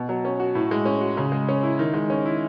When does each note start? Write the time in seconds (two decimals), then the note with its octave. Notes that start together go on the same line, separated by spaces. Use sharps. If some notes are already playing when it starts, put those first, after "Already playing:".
Already playing: B2
0.09 F#3
0.25 C#4
0.40 F#4
0.55 A2
0.71 G#3
0.86 C#4
1.01 F#4
1.17 C#3
1.32 G#3
1.49 C#4
1.63 E4
1.79 D#3
1.94 G#3
2.10 C#4
2.25 E4